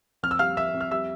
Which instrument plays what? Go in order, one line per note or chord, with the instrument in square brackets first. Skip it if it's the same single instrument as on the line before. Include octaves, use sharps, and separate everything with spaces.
[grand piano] F2 F6
E6
G3 F5 F6
F2 E5 E6
F2
F6
G3 E5 E6